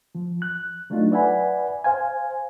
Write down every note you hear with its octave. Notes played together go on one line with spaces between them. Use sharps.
F3
F#6
F#3 A3 D4 D#4 F4
B4 D5 E5 F#5 G#5 B5
C5 F5 G#5